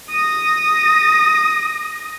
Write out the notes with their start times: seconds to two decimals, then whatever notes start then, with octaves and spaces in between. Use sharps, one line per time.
0.10 D#6 A#6